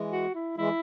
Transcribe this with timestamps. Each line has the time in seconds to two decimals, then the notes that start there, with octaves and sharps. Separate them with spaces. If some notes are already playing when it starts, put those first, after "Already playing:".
Already playing: E3 G#3
0.12 F#4
0.35 E4
0.57 E3 G#3 E4